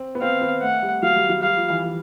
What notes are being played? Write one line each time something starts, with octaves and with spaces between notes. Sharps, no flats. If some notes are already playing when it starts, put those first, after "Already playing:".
Already playing: C4
B3
C4 F5
B3
A3 F#5
G3
F#3 F5
G3
F#3
G3 F5
F3
E3
E3